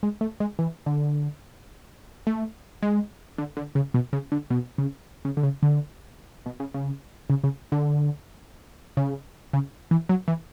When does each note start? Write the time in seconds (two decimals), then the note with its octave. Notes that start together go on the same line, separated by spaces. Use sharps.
0.03 G#3
0.21 A3
0.40 G#3
0.59 E3
0.86 D3
2.27 A3
2.82 G#3
3.38 D3
3.57 D3
3.75 C#3
3.94 B2
4.13 C#3
4.32 D3
4.50 B2
4.78 C#3
5.25 C#3
5.37 D3
5.43 C#3
5.63 D3
6.46 B2
6.60 C#3
6.74 C#3
7.30 C#3
7.44 C#3
7.72 D3
8.97 C#3
9.53 C#3
9.91 E3
10.09 F#3
10.28 E3